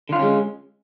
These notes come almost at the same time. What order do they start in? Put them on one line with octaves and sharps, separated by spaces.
D3 F4 D4 C#4 G#3